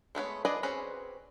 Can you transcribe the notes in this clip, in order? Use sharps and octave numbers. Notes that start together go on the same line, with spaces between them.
G#3 A3 B3 C#5
D4 G#4 B4 D5 D#5
C4 C#4 F#4 G#4 B4